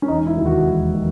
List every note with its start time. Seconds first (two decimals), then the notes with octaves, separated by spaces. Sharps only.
0.02 C#4
0.08 E1 D#4
0.26 E4
0.37 D#2 D#3 F#3
0.46 F#4
0.64 E1
0.94 D#3 F#3